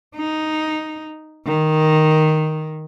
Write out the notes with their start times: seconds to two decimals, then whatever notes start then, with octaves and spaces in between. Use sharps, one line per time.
0.16 D#4
1.46 D#3